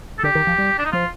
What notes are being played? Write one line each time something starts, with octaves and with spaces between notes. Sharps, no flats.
A4
D3 G4
D#3
F3
G3
D4
D#4
F3 F4